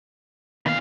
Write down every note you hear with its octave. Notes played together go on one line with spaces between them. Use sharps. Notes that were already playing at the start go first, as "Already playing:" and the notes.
A#2 D#3 A#3 B3 F5